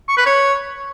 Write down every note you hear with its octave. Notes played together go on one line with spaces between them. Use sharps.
C#6
B4
C#5